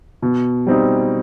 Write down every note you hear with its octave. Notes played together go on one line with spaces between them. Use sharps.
B2
G3 C4 D#4